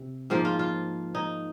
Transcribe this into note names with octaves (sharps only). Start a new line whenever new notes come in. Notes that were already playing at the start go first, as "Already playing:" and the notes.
Already playing: C3
G#2 F3 A#3
F4
F4
D#4